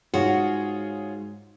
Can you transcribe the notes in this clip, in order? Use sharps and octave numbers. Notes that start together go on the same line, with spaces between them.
G#2 F4 F#4 G#4 C#5